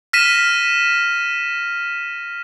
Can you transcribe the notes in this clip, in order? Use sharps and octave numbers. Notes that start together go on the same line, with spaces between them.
F6 A#6 B6 D#7 E7